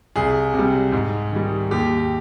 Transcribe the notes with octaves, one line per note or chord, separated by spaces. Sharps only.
C2 G#4
C3 G3
G#2
D#3 G3
D#2 G4